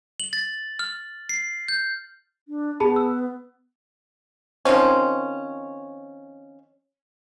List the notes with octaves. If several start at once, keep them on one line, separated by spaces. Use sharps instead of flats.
F#7
A6
F6
C7
G6
D4
B3 G#4 A5 B5
E6
D#3 F3 C4 C#4